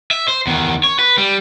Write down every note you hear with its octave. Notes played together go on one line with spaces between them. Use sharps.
E5
C5
E2 D#3
C#5
B4
G3